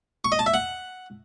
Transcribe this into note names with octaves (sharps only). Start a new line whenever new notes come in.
C#6
D#5
A5
E5
F#5